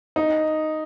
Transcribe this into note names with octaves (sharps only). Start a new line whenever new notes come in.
D#4